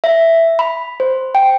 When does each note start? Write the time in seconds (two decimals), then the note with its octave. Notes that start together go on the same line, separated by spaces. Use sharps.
0.04 E5
0.59 B5
1.00 C5
1.35 G5